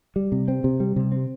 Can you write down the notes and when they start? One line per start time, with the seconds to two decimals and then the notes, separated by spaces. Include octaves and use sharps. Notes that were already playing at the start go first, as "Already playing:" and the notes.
0.16 G3
0.32 C3
0.48 C4
0.64 C3
0.80 G3
0.96 C3
1.12 C4